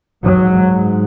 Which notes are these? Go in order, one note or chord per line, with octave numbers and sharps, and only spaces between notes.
G#2 F#3